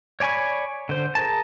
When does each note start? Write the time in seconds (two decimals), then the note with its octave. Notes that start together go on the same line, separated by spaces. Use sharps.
0.20 C#5 D5 G#5 B5 C#6
0.89 D3 C5
1.15 G#4 A#4 A5